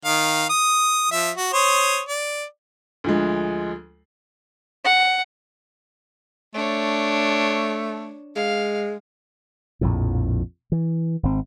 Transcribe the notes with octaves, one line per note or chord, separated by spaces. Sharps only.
D#3 F5
D#6
F3 E5
F#4
C5 C#5 D#6
D5
D2 F3 G#3
F#5
A3 D4 C#5
G#3 F5
A#1 F2 A2
E3
G#1 C4